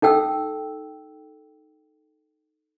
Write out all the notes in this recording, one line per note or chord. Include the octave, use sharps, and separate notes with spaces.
D#4 A4 G5 E6